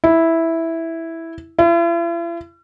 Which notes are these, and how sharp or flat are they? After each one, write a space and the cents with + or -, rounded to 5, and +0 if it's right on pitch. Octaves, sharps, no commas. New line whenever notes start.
E4 -5
E4 +45